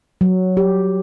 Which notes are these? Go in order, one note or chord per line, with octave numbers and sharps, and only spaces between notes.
F#3
G4